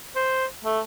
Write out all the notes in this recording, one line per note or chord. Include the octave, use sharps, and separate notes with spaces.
C5
A3